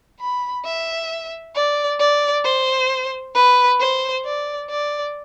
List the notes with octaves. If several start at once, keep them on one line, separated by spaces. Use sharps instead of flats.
B5
E5
D5
D5
C5
B4
C5
D5
D5